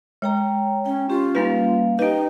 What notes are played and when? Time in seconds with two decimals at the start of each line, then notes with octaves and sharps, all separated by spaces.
0.22 G#3 C#5 G5 A#5
0.86 C#4 G5
1.09 C#4 F4 G4 C6
1.35 G3 A#3 C#4 D#4 B4 F5
1.99 D#4 G4 B4 D#5 G5